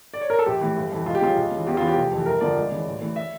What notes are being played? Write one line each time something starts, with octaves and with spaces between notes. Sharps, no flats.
D5
C#5
A#4
A4
A#1 G4
A2 E3
G1
F2 E3
C#2 F4
G4
C#3 F3 F4
C#2
C#3
E3
E2 G4
C#3 E3 F4
G4
F1
F2 E3
G1 A#4
F2 D3 F3 D5
C#2
C#3 E3
A1
A2 E3
E5